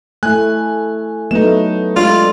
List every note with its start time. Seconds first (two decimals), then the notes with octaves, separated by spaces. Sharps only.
0.23 A3 E4 G#5 F#6
1.31 F#3 A3 B3 D#4 E7
1.97 G#3 D4 F4 A4 D5